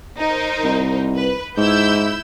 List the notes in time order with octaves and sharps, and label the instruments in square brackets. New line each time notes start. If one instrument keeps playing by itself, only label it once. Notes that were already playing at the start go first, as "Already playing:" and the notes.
[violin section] D#4 A#4 C5
[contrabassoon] C2
[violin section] B4
[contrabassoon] G#2 [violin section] E4 E6 G6